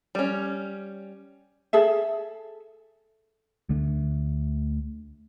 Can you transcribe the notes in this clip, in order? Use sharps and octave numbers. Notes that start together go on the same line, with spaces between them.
G3 C#4
G#4 A4 E5
D2 D3 A3 D4